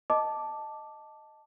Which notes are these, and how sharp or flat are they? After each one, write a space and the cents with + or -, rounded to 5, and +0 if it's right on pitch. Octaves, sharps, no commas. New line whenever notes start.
D#5 +0 A5 +0 D6 +0